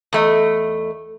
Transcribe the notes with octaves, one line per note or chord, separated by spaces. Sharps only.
E2 A3 D#5